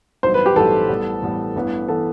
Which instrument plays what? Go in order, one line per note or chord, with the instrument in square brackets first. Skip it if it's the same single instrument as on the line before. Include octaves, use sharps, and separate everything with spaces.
[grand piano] A1 G2 F#3 B3 D#4 [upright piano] C5
[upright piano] B4
G4
[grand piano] A1 G2 F#3 B3 D#4 [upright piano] A4
[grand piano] A1 A2 G3 B3
A1 A2 G3 B3
A1 G2 E3 B3
[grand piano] E3 B3 [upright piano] A4